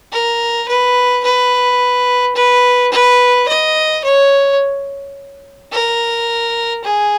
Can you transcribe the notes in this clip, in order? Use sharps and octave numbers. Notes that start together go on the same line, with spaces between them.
A#4
B4
B4
B4
B4
D#5
C#5
A#4
G#4